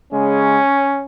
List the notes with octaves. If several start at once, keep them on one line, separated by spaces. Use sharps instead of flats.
C#3 G#3 C#4